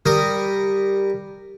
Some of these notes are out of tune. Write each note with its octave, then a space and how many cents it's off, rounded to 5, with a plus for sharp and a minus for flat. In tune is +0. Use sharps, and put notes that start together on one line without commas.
G3 +0 A#4 -10 D#6 -5